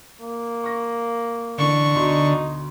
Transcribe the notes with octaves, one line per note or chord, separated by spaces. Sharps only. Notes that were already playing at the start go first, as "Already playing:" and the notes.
A#3
C#6 A#6
A1 D3 C#6
D2 B2 D#4 C6